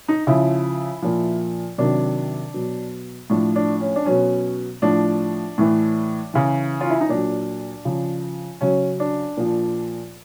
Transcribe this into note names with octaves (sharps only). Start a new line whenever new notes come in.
D#4
C#3 F3 E4
A#2 F3
C3 D#3 F#3 D4
B2 F#3
A2 F3 D4
D4
C#4
D4
B2 F#3 C#4
A2 F3 D4
A2 E3
C#3 E3
F4
E4
D#4
A#2 F#3 D4
C#3 F3
C#3 F#3 C#4
D4
A#2 F3